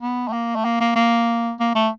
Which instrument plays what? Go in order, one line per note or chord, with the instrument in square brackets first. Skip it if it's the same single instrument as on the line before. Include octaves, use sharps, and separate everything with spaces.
[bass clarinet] B3
A3
A#3
A3
A#3
A#3
A#3
A#3
A3